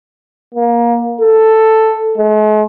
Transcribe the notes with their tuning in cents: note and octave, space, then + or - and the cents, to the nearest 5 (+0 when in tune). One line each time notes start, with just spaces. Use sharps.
A#3 +20
A4 +5
G#3 +45